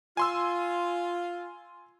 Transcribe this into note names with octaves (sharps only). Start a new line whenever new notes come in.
F4 G#5 C6 E6